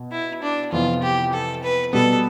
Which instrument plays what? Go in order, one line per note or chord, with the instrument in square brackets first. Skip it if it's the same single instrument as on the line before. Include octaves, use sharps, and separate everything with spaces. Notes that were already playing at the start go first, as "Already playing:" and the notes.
Already playing: [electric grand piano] B2
[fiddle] E4
D4
[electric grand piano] F2 C3 E3 B3 [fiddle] F4
[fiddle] G4
A4
B4
[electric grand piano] B2 G3 B3 [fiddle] A4